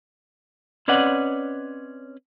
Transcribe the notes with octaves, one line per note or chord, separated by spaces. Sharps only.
C4 C#4 B4 D5 D#5 F#5